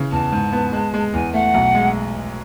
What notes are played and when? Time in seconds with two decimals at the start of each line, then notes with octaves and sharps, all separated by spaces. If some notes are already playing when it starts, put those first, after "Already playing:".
Already playing: C#3 E3
0.12 E2 A5
0.33 G#2
0.53 B3
0.73 G#3
0.94 G#3
1.13 E2 G#5
1.34 A3 F#5
1.54 B1
1.75 G#3